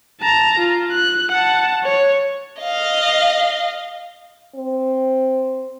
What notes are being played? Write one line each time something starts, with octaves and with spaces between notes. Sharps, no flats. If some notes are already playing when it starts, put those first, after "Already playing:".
A5 A#5
F4
F#6
F#5 A5
C#5
D#5 F5
C4